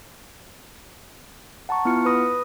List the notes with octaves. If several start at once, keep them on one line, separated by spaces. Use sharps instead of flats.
F#5 A5 A#5 C#6
B3 E4 F4 F6 C#7
B4 B5 D#6 A#6